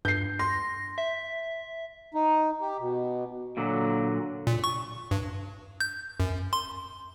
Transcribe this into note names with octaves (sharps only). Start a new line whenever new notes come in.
G2 G6 C7
C6 A#6
E5
D#4
G4
B2
A#2 D3 F#3
A#2
C#6
G2
G6
F#2
C6